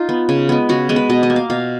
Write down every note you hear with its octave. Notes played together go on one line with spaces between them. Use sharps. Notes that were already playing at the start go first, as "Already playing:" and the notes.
Already playing: D#4 F4
B3
C#3
G#3 B3
C#3 F#4
G#3 B3
B4
B2 D#5
D#5
A#3
F5
B2 F5